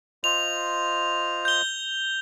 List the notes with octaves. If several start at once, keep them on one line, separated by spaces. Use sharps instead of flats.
F4 C5 D#5 F7
G6 G7